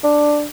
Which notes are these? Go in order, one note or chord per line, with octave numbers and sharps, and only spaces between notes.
D4